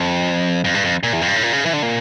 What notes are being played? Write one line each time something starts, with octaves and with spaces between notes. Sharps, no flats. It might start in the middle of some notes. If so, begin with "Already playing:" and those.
Already playing: F2
F2
G2
F2
A#2
E2
F2
G2
A2
A#2
C#3
E3
D3
A#2